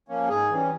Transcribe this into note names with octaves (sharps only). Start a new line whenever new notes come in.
F3 A#3 C#4
G#2 G#4
E3 G3 C#4